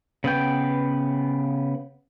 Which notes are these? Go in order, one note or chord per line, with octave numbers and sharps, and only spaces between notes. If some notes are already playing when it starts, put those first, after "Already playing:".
C#3 B3 G5